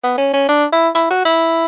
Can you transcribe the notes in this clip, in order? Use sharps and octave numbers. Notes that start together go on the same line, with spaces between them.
B3
C#4
C#4
D4
E4
E4
F#4
E4